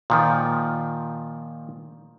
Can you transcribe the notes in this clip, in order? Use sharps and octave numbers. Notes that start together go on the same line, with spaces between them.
A#2 D#3 F3